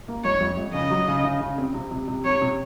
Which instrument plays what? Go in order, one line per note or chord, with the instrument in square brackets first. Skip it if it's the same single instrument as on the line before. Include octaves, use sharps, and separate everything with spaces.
[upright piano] A#3
[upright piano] F2 [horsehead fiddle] C#5
[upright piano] F2
F2
[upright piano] C#3 [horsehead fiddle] D#5
[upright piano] F#3
C#3
C#3
C#3
C4
C3
C3
C3
[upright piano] C3 [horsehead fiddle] C#5
[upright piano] C3